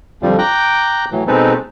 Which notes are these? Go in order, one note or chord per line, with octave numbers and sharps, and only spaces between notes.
F2 D3 F3 G3
G5 A#5 D6 F#6 G6
A2 E3 F#3
B2 G#3 C4 D#4 A4 B4